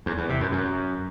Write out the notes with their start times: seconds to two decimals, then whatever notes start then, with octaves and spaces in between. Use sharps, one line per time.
0.06 E2
0.18 E2
0.29 C3
0.41 F#2
0.52 F#2